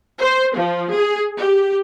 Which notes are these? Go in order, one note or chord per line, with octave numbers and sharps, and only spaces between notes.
C5
F3
G#4
G4